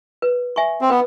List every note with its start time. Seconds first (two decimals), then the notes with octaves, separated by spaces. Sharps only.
0.22 B4
0.56 E5 G#5 C#6
0.81 C4
0.90 B3 B4